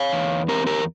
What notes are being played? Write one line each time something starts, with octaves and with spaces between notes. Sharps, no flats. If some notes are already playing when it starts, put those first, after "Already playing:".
Already playing: C#5 F5
E2
C4 G4 A#4
G4 A#4